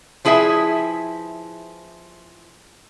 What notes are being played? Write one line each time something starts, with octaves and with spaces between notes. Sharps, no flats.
F3 E4 G#4 B4 E5